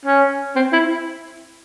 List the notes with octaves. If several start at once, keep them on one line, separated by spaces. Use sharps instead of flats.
C#4
C4
E4